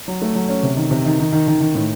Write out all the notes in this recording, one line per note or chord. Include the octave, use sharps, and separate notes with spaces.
F#3
A3
F#3
C#4
C3
D#3
C3
D#3
D#3
D#3
D#3
D#3
A2